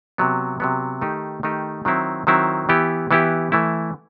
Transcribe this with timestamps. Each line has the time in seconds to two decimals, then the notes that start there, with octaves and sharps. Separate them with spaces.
0.18 C3 F#3 B3
0.60 C3 F#3 B3
1.01 D#3 A3 D#4 G4
1.43 D#3 A3 D#4 G4
1.85 D#3 F#3 C4 E4
2.27 D#3 F#3 C4 E4
2.69 E3 B3 E4 G4
3.11 E3 B3 E4 G4
3.52 E3 A3 E4